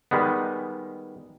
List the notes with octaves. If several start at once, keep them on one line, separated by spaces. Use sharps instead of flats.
D#3 G3 G#3 B3